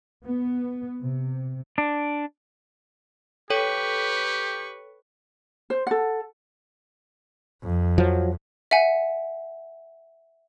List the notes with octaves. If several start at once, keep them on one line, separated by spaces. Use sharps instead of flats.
B3
C3
D4
G4 A4 B4 C#5 G5 C#6
C5
A4 F#5
F2
F3 F#3
E5 F#5 G#5